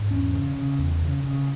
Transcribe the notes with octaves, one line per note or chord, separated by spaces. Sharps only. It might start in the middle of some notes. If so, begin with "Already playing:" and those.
Already playing: G#2
E2 C#4
C#3
C#3
E2
C#3
C#3